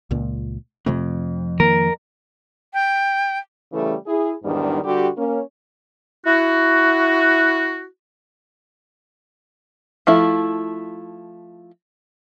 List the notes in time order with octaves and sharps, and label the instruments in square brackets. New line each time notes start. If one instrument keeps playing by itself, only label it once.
[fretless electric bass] C#2 A#2
[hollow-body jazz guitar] F2 [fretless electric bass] C3 F3 A3
[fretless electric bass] D#3 A#3 [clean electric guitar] A#4
[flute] G5
[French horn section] C#3 E3 G3 A3
E4 G#4
E2 G#2 D#3 G3 D4
D3 G3 F#4 G4
A#3 C#4
[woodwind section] E4 F#4
[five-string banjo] F3 A3 E4